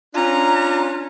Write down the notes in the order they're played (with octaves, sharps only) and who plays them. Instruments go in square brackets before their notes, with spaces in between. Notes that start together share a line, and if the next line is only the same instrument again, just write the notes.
[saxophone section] C#4 D4 F4 [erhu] A#5